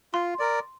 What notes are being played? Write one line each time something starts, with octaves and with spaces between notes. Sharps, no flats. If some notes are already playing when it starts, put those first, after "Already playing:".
F4 C6
A#4 D5